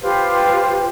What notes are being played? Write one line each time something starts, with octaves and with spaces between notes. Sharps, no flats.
F4 G4 B4 C5